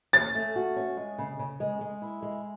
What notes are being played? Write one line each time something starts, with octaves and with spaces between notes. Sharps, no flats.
C#4 A6
A3
F#4
C#4
G#3
C#3
C#3
G#3
G#3
E4
G#3